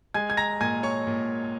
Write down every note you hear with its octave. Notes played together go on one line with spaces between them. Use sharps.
G#3 G#5 G#6
G#6
A#5 A#6
A#2 G#5 G#6
C#5 C#6
A#2